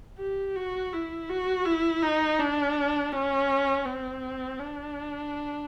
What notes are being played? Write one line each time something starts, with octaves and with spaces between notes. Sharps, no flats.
G4
F#4
E4
F#4
E4
D#4
D4
C#4
C4
D4